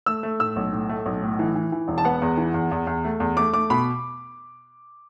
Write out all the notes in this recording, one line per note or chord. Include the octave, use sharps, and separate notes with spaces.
A3 E6
A3
A2 E6
B1
A2
A3
B1
A2
E3
E3
E3
E1
A5
B3 F#5
E2
E3
E2
E2
E2
A3
E2
A3 D6
A3 D6
B2 B5